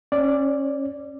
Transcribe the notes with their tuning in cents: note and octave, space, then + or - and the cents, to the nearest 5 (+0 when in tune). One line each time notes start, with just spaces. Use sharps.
C#4 -25 D5 +0